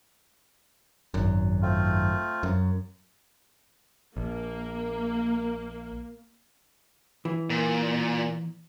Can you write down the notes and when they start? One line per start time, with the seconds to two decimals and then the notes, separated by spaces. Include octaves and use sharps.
1.14 G#1 F#2
1.62 A3 C4 F4
2.43 F#2
4.17 A#1 A#3
7.25 E3
7.50 A#2